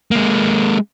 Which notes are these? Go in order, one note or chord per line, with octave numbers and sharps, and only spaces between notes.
G#3 A#3